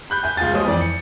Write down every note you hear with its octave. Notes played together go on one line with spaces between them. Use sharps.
B5 F#6 G6
E5 G#5 F#6 G6
C#2 F4 G#4 G#5 A6
F3 G#3 C#5 D#6
F2 E3 D5
C#7